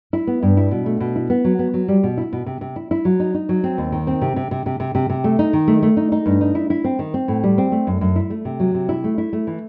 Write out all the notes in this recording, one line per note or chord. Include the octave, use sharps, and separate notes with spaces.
E4
B3
G2
E4
B2
A3
B2
E4
B3
F#3
B3
F#3
G3
B2
E4
B2
C3
C3
E4
E4
F#3
D#4
D#4
F#3
C4
D#2
D#3
C4
C3
C3
C3
C3
C3
C3
C3
A3
D#4
D#3
A3
A3
D#4
D#4
G2
D#4
E4
E4
C4
D#3
C4
A2
G3
C4
A3
F#2
F#2
E4
A3
C3
F#3
C3
E4
A3
E4
A3
E3